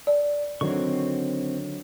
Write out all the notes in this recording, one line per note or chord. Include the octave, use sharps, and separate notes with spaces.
D5
D3 D#3 F#3 C4 C#6